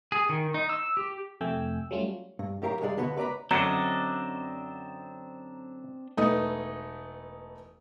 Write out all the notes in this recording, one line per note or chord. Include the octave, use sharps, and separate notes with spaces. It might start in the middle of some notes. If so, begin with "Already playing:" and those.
G#4
D#3
D#4
E6
G4
F2 C3 A3 G5 G#5 E6
F#3 G3 A3 C#4 F4
G2
F#2 A2 G4 A#4 F5 A#5
C2 G2 G3 G#3 G#4 D5
D#2 D3 B3 F#4 B5
C#2 B4 D5 A#5 B5
F#2 D3 F#3 C4 D4 D#5 A#5
E1 A3 B3 D#4 D#6